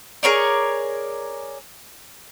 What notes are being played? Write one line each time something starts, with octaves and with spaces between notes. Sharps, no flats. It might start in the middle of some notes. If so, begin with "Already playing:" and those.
G#4 A#4 C#5 D5